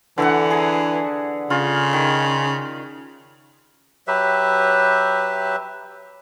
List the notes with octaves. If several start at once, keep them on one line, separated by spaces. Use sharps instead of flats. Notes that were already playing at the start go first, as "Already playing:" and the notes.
D3 E3 E5 F#5
G#4 A#5
C#3 F4
D#3
F#3 G4 B4 E5